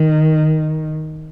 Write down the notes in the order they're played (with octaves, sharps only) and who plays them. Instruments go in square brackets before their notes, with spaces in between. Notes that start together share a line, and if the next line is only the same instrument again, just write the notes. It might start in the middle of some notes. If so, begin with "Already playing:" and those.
Already playing: [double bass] D#3